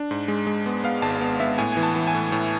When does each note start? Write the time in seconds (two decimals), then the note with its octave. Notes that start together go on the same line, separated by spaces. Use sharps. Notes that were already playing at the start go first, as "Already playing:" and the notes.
Already playing: D4
0.11 G#2
0.28 G#3
0.47 G#3
0.66 B3
0.84 B3 F5
1.02 G#1 A5
1.21 B3
1.40 B3 E5
1.58 A2 G#5
1.72 E3 G#5
1.83 A5
1.96 E3
2.07 G#5
2.15 A2
2.32 A2